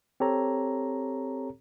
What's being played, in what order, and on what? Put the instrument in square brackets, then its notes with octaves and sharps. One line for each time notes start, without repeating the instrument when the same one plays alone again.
[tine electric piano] C4 G4 A4 C#5 A#5